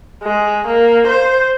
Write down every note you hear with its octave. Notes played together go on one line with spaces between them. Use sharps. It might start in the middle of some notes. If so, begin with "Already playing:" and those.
G#3
A#3
C5